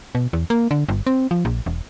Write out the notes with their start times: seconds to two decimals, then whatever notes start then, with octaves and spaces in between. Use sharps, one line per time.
0.15 B2
0.33 E2
0.50 A#3
0.71 D3
0.89 G1
1.07 C4
1.31 F3
1.45 A#1
1.66 E1